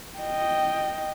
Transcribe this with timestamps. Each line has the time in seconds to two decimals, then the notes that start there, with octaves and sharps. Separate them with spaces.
0.18 D#5 G5